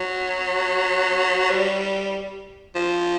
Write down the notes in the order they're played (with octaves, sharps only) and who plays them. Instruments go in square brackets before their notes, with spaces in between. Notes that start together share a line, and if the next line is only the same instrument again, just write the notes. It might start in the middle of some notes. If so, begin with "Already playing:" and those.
Already playing: [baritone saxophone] F#3
G3
F3